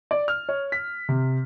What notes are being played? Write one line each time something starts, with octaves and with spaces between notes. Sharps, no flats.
D5
F6
C#5
B6
C3